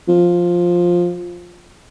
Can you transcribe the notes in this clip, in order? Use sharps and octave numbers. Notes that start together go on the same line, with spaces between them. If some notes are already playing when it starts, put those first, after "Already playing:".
F3